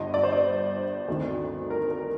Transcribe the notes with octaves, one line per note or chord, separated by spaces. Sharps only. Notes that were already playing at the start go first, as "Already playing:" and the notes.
Already playing: G1 G2 D3 D#5
D5
C5
D5
D2 C3 D#3
A#4
A#4